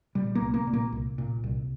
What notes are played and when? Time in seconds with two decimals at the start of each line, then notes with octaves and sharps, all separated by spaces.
0.15 A#2 G3
0.35 A#3
0.41 C2
0.54 A#3
0.67 A#2
0.73 A#3
0.92 C2
1.18 A#2
1.44 C2